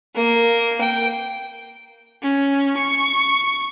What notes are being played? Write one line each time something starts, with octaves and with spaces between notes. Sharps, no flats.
A#3
G5
C#4
C#6